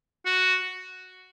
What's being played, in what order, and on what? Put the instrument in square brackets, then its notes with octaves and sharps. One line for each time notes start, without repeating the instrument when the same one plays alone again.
[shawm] F#4